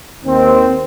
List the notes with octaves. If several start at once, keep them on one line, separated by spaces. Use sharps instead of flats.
D#2 D#3 C4